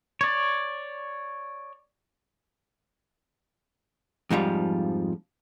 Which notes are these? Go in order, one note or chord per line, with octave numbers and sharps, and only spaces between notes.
C#5 D5
F2 G#2 F3 G3